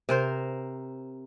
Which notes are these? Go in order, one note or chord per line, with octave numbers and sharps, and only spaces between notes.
C3 A#4 C5